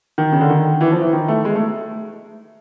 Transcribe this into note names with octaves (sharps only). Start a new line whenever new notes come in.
D#3
C#3
D3
D#3
E3
F3
E3
D#3
A3
G#3
A3